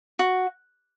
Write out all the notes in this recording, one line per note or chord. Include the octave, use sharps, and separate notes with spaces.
F#4